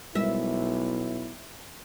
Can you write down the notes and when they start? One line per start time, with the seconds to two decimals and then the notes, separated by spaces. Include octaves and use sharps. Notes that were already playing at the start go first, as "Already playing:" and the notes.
0.15 B1 G3 G#3 E4 A#4 E5